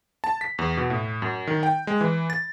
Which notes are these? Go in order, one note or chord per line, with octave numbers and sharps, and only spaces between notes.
A5
B6
E2
B2
A2
F#2
D#3
G5
G#3
E3
A6